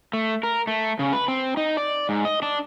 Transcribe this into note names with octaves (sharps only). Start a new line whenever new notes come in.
A3
A#4
A3
C#3
B4
C4
D#4
D5
G#2
D#5
D4